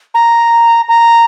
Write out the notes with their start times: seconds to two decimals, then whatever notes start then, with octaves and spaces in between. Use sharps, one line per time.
0.14 A#5
0.88 A#5